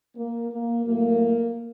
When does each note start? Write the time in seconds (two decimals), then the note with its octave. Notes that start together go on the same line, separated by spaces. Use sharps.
0.16 A#3
0.50 A#3
0.85 A2 F#3 A3 A#3